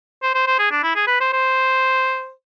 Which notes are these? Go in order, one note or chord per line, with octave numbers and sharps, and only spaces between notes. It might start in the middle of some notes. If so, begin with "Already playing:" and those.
C5
C5
C5
G#4
D4
E4
G#4
B4
C5
C5